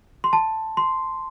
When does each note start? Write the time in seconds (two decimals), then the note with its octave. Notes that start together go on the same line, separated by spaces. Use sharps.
0.24 C6
0.33 A5
0.77 C6